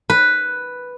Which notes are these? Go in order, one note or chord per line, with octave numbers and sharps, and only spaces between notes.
B4